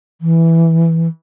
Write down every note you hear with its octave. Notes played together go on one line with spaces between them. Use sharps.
E3